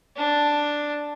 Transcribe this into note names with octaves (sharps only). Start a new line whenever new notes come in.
D4